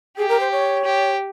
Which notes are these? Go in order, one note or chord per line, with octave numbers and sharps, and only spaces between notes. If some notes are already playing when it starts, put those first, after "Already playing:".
G4 G#4
A#4
C5
C#5
G4